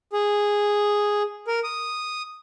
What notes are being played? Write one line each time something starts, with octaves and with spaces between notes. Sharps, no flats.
G#4
A#4
D#6